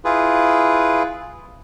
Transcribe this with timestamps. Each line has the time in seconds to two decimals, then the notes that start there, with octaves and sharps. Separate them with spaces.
0.05 E4 F4 G#4 B4